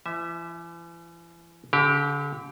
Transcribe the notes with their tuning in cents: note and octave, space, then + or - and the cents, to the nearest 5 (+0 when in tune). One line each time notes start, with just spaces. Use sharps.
E3 +40 E5 -10
D3 -40 G4 +0